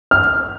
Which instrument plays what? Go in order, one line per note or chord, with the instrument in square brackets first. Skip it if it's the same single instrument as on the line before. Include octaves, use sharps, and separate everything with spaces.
[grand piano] F6